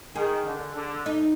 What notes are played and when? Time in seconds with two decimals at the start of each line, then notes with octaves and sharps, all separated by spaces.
0.15 D#3 G#4
0.45 D3
0.76 D3
1.06 D#4